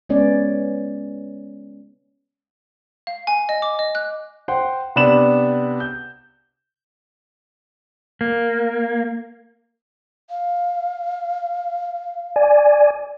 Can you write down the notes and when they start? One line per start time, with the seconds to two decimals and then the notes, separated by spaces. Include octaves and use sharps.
0.09 G#3 B3 C#4 C#5 D5
3.07 F5
3.27 G#5
3.49 D#5
3.62 D6
3.79 D#5
3.95 F#6
4.48 C5 F#5 G5 C6
4.96 C3 B3 D4 B5 E7 F#7
5.80 G6
8.21 A#3
10.30 F5
12.36 D5 G#5